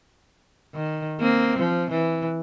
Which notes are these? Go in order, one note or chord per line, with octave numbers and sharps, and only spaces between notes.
D#3
A#3 C4
F3
E3